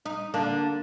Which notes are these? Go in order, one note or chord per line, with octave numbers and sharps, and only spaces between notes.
D#4
D3 A#3 D4